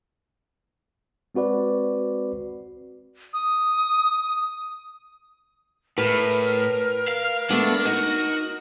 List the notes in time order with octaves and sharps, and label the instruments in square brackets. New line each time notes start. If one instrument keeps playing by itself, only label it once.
[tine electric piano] G#3 C4 F#4 B4 D5
[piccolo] D#6
[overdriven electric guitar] A2 [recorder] A#4 [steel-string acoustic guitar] B4
[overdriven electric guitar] F5
[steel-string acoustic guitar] A3 B3 [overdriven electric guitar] D4
[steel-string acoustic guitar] D#4 [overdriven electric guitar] F#4